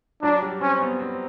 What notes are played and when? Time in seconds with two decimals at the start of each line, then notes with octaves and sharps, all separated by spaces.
0.23 F#3 D4
0.42 G3
0.61 C4 C#4
0.81 B3
0.99 C4